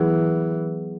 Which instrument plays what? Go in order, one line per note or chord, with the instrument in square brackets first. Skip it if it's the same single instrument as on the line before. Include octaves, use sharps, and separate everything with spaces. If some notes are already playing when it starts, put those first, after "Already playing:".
Already playing: [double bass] E3 [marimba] F#3 B3 E4 G#4